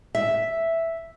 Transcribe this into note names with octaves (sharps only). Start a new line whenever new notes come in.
E5